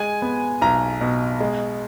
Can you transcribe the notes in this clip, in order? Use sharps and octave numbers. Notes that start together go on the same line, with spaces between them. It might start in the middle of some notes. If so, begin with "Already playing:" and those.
Already playing: G#3 G#5
B3
B1 A#5
B2
G#3